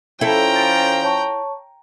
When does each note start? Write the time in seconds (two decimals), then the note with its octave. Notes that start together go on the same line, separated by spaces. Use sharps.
0.21 F3 C#4 E4 A4 G5 A#5
0.56 A6 D7
1.02 C#5 A5 C#6